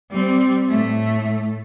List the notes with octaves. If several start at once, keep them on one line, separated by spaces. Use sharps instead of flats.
G3 C4
A2 A3